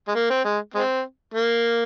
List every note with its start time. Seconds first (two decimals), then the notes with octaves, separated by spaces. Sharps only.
0.08 G#3
0.15 A#3
0.30 C4
0.45 G#3
0.74 G#3 C4
1.34 A#3